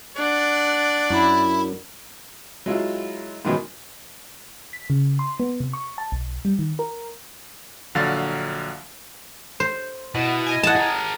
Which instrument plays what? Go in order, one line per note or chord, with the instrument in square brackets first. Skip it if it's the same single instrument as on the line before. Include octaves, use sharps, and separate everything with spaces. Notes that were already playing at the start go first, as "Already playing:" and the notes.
[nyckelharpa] D4 F#5 [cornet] D5
[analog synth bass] F#2 [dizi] E4
[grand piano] F#3 G#3 E4 F4
G#2 B2 D#3 E3 F#3 G#3
[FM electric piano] B6
C#3
C6
B3
C3
C#6
A5
B1
G3
D#3
A#4
[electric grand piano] A#1 D3 F#3 F5 A6
[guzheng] C5
[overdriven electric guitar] B2 [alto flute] E4 [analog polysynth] F#5
[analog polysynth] D#5 G#5
[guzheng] F#5 A5
[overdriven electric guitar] G#4 A#4